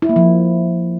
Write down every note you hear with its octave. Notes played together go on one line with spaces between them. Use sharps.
E4
A#3
F3